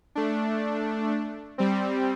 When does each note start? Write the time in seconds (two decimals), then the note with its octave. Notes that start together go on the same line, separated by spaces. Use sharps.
0.15 A3 D4
1.58 G3 C4